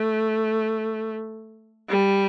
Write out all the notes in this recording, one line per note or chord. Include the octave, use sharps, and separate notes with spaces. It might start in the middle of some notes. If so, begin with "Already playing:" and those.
Already playing: A3
G3